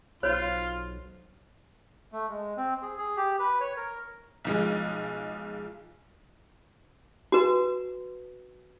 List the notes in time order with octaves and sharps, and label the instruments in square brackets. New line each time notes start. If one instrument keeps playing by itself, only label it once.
[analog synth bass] B1 [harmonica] F4 [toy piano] C5 C#5 B5
[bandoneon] A3
G#3
C4
G#4
G#4
G4
B4
C#5
A#4
[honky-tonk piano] B1 F3 G#3
[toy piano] F#4 B4